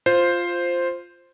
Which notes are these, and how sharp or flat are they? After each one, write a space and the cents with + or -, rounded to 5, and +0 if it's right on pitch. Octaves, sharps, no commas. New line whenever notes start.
F4 +0 C5 +0